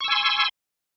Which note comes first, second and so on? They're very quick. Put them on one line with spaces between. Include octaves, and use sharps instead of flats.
C#6 E6 G#5 C6